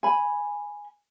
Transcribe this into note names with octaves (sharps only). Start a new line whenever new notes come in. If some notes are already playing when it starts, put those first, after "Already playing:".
G#5 B5